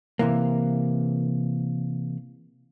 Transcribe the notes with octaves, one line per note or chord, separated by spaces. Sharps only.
C3 E3 A#3